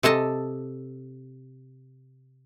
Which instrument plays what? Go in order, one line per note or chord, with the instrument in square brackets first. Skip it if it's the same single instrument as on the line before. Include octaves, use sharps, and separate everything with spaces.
[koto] C3 A4 D#5 A5